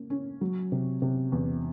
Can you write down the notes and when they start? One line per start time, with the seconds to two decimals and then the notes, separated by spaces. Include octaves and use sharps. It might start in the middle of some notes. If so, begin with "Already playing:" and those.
Already playing: A#3 C#4
0.10 C#4
0.41 F#3
0.72 C3
1.02 C3
1.32 E2